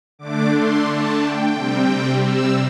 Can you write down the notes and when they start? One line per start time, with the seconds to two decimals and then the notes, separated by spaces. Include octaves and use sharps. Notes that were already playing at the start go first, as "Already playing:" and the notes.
0.19 D3 A3 D4 D6
0.52 C6
0.86 A5
1.21 G5
1.53 C3 G3 C4
2.22 E6